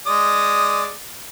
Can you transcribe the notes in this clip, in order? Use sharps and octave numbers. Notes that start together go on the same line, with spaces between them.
G#3 D5 D#6